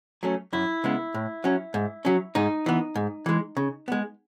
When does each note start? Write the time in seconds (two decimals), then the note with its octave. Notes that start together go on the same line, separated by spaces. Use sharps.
0.23 F#3 A3 C#4
0.53 F#2 E4
0.84 C#3 G#3 B3
1.14 A2
1.44 F#3 C#4
1.74 G#2
2.05 F#3 C#4
2.35 G#2 D#4
2.66 E3 B3
2.96 G#2
3.26 E3 G#3
3.57 C#3
3.88 G#3 B3